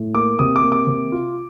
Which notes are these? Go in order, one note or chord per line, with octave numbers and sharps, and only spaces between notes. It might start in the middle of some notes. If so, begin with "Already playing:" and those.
Already playing: A2
A#3 D6
C3 D#6
D6
A#3
D6
C3
F4